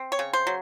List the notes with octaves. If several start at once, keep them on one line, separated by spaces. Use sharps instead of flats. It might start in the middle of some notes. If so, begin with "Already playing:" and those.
Already playing: C4
C#5
C#3
C5
F#3